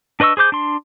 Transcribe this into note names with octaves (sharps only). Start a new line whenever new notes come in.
D4 B4 D#5 C#6 E6
G#4 C5 D6 G6
D4 C6